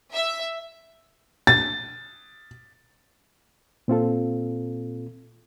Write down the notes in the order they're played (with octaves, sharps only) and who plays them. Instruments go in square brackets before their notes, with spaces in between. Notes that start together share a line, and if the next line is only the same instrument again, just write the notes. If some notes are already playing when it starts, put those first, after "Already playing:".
[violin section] E5
[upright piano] A6
[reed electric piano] A#2 C4 F4 A4